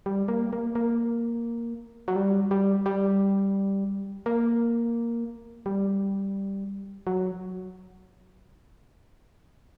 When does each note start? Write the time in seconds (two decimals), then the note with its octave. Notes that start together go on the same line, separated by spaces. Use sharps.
0.06 G3
0.28 A#3
0.53 A#3
0.75 A#3
2.08 F#3
2.16 G3
2.51 G3
2.86 G3
4.26 A#3
5.66 G3
7.07 F#3